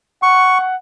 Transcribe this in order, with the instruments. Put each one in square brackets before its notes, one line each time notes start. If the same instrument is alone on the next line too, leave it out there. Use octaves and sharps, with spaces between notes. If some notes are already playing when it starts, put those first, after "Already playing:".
[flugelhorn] F#5 [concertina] C#6